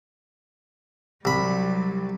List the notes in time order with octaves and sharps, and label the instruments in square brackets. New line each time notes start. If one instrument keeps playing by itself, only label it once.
[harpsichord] C2 B5 [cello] F#3 G3